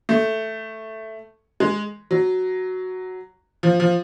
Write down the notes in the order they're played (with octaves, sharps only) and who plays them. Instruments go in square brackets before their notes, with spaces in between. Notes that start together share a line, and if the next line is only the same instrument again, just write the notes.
[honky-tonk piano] A3
G#3
F#3
F3
F3